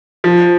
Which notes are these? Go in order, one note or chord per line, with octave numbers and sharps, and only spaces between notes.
F3